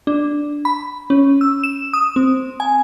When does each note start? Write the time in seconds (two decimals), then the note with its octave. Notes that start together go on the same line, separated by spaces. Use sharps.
0.07 D4
0.65 B5
1.10 C#4
1.41 E6
1.63 E7
1.93 D#6
2.16 C4
2.60 G#5